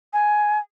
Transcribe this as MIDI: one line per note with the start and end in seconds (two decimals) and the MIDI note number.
0.13 0.59 80